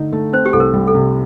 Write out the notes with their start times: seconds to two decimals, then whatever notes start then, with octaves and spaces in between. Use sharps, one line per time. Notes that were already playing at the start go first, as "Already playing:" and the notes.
Already playing: D3 A3 D#4
0.12 A3
0.33 C4 C5
0.46 G4
0.53 C2 A4
0.60 A#4
0.74 G3
0.87 A4
0.94 C3